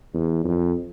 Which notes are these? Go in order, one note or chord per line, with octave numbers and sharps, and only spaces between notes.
E2
F2